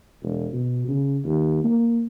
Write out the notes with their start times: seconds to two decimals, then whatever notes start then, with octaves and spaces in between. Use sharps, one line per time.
0.22 E1
0.53 B2
0.88 C#3
1.25 D#2
1.64 A#3